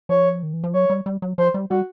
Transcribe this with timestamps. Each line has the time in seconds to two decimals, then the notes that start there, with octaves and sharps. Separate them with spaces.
0.09 F3 C#5
0.43 D#3
0.54 E3
0.64 F3
0.74 F#3 C#5
0.90 G3
1.06 G3
1.22 F#3
1.38 F3 C5
1.54 G3
1.70 G3 F#4